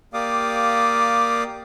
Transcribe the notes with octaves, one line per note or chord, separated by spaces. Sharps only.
A#3 G4 D5 F5 D6 D#6